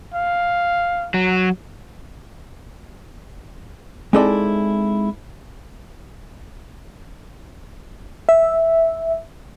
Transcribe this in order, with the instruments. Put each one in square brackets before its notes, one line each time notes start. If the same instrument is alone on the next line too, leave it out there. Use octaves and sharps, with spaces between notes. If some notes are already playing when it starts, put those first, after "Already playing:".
[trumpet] F5
[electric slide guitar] F#3
[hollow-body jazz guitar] G#3 C4 D#4 E4 A4 D5
[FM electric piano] E5